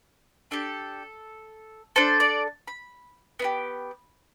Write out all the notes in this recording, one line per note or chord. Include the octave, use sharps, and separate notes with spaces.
D4 G4 A4
D4 A4 C5
D5
B5
B3 E4 G4